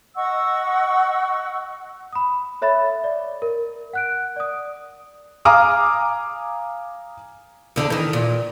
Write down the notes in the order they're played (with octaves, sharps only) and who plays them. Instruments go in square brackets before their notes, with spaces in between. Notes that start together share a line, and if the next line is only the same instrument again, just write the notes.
[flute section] D#5 F#5 C#6 E6
[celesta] B5 D#6
A4 C#5 E5 B5 A6
D5
A#4
F#5 F#6 D7
D5 D#6
[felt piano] F5 G#5 A#5 D6 D#6 F6
[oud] E2 D3
D#3 E3
A#2